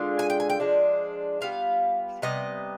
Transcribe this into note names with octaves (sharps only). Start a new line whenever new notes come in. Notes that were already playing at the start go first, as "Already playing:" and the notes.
Already playing: D3 G#3 F4
G#5
G5
G#5
G5
F3 G#3 D4
G3 B3 F4 F5
C3 G3 B3 D#5